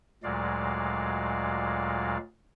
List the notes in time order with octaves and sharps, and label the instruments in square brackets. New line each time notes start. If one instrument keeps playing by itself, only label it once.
[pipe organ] D2 A#2 F#3 G#3 D5 F5